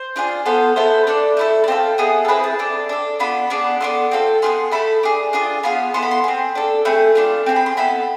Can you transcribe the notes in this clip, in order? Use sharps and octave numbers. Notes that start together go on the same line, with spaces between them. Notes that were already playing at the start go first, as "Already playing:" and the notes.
Already playing: C5
D4 F4 G#4
B3 F4 A4 C5
B3 E4 A4 C5
D4 A4 D5
A3 E4 A4
D5
C4 F4 A4 C5
B3 E4 G#4
A4
C4 E4 G#4 B4
A5
D4 A4
D4 A4
B3 D4 F4 B5
B3 D4 G#4
B3 D4 F4 A4 C6
C4 F4 A4
B3 F4 G#4 C6
A3 E4 A4 B5
D4 G#4
D4 F4 G#4
B3 F4 G#4 B5
B3 E4 A4 C6
B5
C6
C4 G#4
D4 A4
A3 C4 G#4 B5
A3 D4 F4
C4 E4 G#4
B5
C6
B3 E4 A4 B5